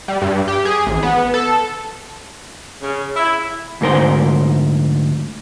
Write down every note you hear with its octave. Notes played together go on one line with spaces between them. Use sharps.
G3
G2
G4
G#4
A1
B3
A4
C#3
E4
D2 G#2 A#4 C5